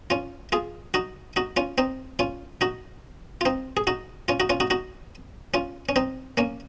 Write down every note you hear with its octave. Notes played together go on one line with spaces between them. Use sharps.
C#4 F4
F4 G#4
D#4 F#4
D#4 F#4
C#4 F4
C4 D#4
C#4 F4
D#4 F#4
F4
C4 D#4
G#4
D#4 F#4
C#4 F4
D#4 F#4
C#4 F4
D#4 F#4
D#4 F#4
C#4 F4
C#4
C4 D#4
A#3 C#4